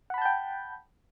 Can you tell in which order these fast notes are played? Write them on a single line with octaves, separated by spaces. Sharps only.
F#5 B5 A5 G6 G5